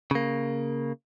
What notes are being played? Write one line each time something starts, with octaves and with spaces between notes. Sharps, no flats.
C#3 A#3